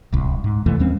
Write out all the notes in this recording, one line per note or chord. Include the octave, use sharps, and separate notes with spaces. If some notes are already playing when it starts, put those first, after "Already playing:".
D1 C2
G#2
F2 C3 E3 A3
D#2 G3 C4 C#4